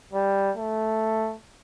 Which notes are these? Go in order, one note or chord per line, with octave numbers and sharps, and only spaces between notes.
G3
A3